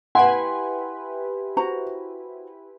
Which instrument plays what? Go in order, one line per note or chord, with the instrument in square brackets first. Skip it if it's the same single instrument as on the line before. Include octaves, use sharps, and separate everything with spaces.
[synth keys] E4 G4 B4 [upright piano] F#5 [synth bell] G#5 C6
[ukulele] F#4 C5 A#5